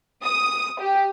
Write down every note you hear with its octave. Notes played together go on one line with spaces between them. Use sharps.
D#6
G4